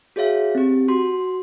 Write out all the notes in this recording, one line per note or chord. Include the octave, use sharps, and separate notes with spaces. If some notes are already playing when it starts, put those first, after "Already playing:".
F#4 G#4 C#5 E5 F5
C4 G4
F#4 C6